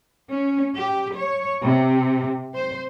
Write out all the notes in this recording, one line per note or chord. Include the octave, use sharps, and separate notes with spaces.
C#4
G4
C#5
C3
C5